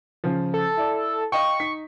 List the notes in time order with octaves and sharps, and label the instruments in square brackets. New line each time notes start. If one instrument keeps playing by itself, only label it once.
[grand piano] C#3 F3
[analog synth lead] A4
[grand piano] E4 D5
[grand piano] D#5 F5 G5 [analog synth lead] C#6
[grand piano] D#4 B6